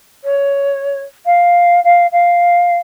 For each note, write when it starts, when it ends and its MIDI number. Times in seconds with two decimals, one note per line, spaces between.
0.24 1.00 73
1.26 1.80 77
1.84 2.07 77
2.12 2.76 77